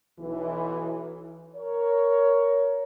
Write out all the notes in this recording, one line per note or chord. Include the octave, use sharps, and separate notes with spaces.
B1 E3
A#4 C#5